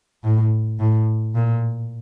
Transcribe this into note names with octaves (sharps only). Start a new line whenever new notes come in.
A2
A2
A#2